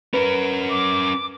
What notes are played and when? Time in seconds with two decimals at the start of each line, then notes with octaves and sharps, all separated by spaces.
0.14 C#4 A#4 B4
0.70 D6